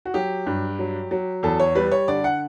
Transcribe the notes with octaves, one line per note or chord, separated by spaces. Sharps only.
F#4
F#3 G4
G2
F#3
F#3
E2 A4
C#5
G3 B4
C#5
D3 D5
F#5